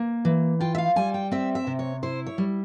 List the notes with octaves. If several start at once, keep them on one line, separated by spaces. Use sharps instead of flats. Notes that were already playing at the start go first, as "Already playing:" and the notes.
Already playing: A#3
E3
F4 G5
E5
F5
G3 G#5
G5
C4 E5
E5
C3
C#5
E4 C5
C#5
G3